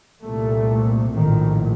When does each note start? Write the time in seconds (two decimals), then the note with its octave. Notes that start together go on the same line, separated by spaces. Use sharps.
0.23 C2 A#2 A3
1.14 A#1 A2 D#3